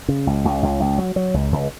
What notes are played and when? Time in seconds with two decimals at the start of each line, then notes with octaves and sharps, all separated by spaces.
0.08 C#3
0.27 C#2
0.45 C#2
0.63 C#2
0.80 C#2
0.98 F#3
1.16 F#3
1.34 C#2
1.52 C#2